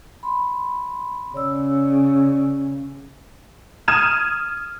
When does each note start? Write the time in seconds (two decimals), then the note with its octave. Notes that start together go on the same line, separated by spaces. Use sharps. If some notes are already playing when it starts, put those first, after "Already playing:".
0.23 B5 C6
1.34 C#3 C#5 D5 E6
3.88 D#6 F6 G#6 D#7 E7